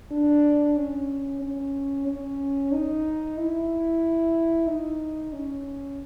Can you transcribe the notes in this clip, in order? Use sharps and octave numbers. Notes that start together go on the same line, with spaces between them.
D4
C#4
C#4
C#4
D#4
E4
D#4
C#4